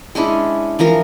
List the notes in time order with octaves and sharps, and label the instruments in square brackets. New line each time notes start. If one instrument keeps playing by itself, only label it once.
[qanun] G#3 C#4 D4 E4
E3 F3 A#4 A#5